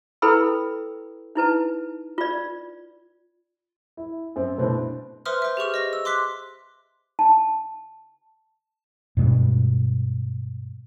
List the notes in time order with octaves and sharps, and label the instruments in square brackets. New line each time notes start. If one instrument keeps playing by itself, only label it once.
[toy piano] E4 A4 B4 G5 B5 E6
D#4 E4 B4 A5
F4 D5
[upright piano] E4
F#2 C4
B2 A3 C4 D4 E4
[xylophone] B4 C5 E5 C6 D#6 F6
C5 E5
G4 G#4 C#6 F6
D#5 A#6
E6
C6 D6 F#6 B6
[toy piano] A5
[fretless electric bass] G2 B2 G#3